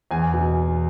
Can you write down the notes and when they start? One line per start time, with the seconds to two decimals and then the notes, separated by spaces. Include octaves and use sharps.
0.11 E2 G#5
0.33 B2